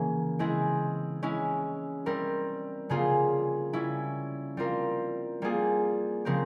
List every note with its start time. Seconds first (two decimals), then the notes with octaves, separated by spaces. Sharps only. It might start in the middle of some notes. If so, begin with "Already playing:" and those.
Already playing: C#3 E3 A#3 C#4
0.39 G#3 C4 E4 G#4
1.23 G#3 C#4 E4
2.06 G3 C4 E4 A#4
2.89 C#3 G3 A#3 F4 G#4
3.73 G3 C#4 E4
4.57 G3 C4 F4 A#4
5.42 G3 A#3 F4 G#4
6.25 C#3 F3 C4 G4 A#4